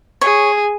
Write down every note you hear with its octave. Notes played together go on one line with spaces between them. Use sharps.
G#4 C#5